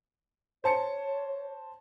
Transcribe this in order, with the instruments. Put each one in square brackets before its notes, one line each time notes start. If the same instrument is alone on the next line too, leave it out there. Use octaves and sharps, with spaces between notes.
[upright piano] C5 A5 C#7 [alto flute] C#5